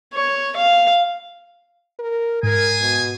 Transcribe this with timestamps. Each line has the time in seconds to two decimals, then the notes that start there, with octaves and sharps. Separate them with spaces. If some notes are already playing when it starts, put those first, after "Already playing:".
0.14 C#5
0.56 F5
1.99 A#4
2.43 G#2 G#4 A#4 G#5
2.80 B2